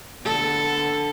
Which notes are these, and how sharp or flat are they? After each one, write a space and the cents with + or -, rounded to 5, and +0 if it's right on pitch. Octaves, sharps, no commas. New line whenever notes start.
D3 +0 B3 +0 A4 +0